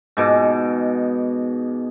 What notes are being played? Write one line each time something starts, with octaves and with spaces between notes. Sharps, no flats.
G#2 B2 D6